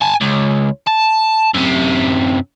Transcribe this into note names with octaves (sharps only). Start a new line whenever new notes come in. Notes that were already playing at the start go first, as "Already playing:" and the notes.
G#5 A5
C#2
A5
F#2 C3